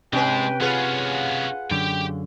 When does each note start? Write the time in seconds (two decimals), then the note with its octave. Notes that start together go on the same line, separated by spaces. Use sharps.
0.13 G#2 C3 G#3 C#4 B4 G5
0.61 B3 C#4 F4 G#4 B4 F#5
1.71 F#2 D3 G4 G5